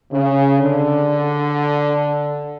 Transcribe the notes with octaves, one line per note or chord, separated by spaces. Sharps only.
C#3
D3